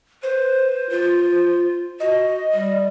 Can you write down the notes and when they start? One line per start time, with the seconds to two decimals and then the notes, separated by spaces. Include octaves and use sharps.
0.23 B4 C5
0.90 F4
2.00 F#4 D#5
2.53 G3